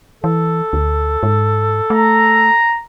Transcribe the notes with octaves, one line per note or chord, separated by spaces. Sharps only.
E3 A4
D2
G#2
A3 A#5